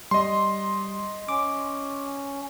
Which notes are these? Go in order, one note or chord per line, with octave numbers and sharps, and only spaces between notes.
G3 D#5 C6
C#4 D6